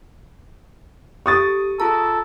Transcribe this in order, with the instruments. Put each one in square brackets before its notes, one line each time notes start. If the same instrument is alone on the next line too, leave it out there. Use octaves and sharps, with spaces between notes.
[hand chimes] G4 A4 [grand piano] C#6 D#6 A6
[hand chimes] F4 G#4 A#5 [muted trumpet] A4